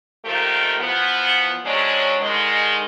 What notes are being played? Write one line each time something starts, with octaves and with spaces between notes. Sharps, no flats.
D#3 F3 A3 A#3 G4
E2 F3 B3
C3 F#3 G#3 C#4 D4
D3 D#3 G#3